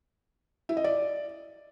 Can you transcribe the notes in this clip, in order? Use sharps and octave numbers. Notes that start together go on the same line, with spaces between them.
E4
D#5
D5